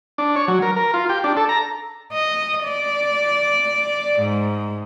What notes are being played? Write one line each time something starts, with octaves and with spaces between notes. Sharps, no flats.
D4
C#5
F#3
A#4
A#4
F4
G4
D4
A4
A#5
D#5
D5
G#2